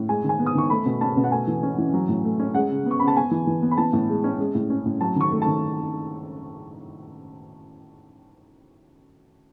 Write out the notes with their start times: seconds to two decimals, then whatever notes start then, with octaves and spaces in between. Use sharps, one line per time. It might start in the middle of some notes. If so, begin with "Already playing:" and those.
Already playing: A2
0.09 G#3 G#5
0.24 D#3
0.29 G#5
0.39 B3
0.46 D#6
0.55 D#3 C#6
0.70 A3 B5
0.86 B2
1.01 C#4 A5
1.17 B2
1.24 F#5
1.32 A3 G#5
1.47 E3
1.63 C#4
1.78 E3
1.94 F#3
2.09 A2
2.24 A3
2.39 C#4
2.54 G#3 F#5
2.70 C#3
2.86 B3
2.91 C#6
3.00 C#3 B5
3.08 A5
3.16 B3 G#5
3.31 E3
3.47 E3
3.62 B3
3.71 B5
3.77 E3 A5
3.93 A2
4.09 G#3
4.24 C#4
4.39 G#3
4.55 A2
4.70 C#4
4.85 A2
5.01 F#3 A5
5.16 D#3 C#6
5.31 A3
5.42 D#3 A5